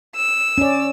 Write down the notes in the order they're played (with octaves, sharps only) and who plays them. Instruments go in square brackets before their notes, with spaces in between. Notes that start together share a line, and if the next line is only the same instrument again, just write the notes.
[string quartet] E6
[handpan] C#4 D5